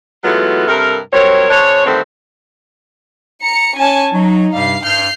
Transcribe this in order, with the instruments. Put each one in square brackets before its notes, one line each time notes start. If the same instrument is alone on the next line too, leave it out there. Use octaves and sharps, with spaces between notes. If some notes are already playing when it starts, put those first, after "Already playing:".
[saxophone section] E3 F#3 G#3 A3 B3 F4
G2 C3 A4 A#4
F#3 G3 C4 A#4 C#5
C#3 D4 C5 C#5
G2 D3 D#3 A3 C4
[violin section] A#5 C#7
C#4 G#5 A5
[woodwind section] F#3 [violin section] D#4
[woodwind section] G2 C3 G3 [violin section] F5 C7
[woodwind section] G2 [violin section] F6 G6 C7